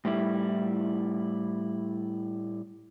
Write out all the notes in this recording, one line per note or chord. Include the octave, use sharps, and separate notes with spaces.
A2 G3 E4